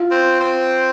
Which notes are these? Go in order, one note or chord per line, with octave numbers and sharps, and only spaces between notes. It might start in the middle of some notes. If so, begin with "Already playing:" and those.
Already playing: F4
C4
C4